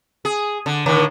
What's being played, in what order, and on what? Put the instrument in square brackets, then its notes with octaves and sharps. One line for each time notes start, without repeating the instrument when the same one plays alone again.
[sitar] G#4
D3
A2 D3 D#3